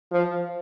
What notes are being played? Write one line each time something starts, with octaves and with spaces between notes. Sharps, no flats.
F3